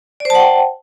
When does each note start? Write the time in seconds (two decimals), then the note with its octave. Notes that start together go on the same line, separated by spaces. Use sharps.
0.20 D5
0.25 C5
0.30 A5
0.35 F#5
0.40 G5